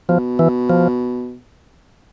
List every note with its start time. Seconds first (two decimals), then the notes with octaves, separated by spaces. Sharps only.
0.09 B2 F3
0.39 E3
0.69 F3